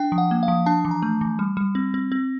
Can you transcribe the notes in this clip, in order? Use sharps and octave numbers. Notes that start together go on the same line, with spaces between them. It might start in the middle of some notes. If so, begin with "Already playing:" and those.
Already playing: D4 G5
F3
F#5
A#3
F5
F3
D4 A5
E3
A#5
A3
E3
G3
G3
C4
C4
C4